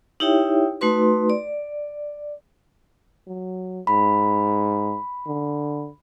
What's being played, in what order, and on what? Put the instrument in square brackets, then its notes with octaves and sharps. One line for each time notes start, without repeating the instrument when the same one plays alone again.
[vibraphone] D#4 E4 G4 C#5 E5 G5
A3 D#4 F#4 B4 C6
D5
[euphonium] F#3
[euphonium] G#2 [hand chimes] B5
[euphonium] D3